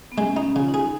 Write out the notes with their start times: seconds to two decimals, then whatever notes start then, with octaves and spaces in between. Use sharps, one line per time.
0.12 B3
0.17 G#3 C#4
0.36 D#4
0.43 C#4
0.56 C#3 F4
0.68 D#4
0.74 G#4